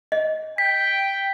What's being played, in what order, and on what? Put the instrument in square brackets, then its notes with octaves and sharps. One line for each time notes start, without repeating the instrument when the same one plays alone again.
[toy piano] D#5
[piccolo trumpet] G5 [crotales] B6